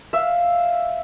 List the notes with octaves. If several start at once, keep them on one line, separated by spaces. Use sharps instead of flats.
E5 F5